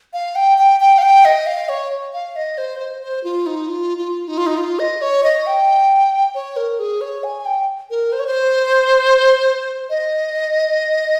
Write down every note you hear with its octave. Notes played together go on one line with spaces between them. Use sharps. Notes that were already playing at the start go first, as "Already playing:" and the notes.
F5
G5
G5
G5
F5
G5
D#5
F5
C#5
F5
D#5
C5
C5
C5
F4
D#4
F4
F4
D#4
F4
D#4
F4
D#5
C#5
D#5
G5
C#5
A#4
G#4
C#5
G#5
G5
A#4
C5
C#5
C5
D#5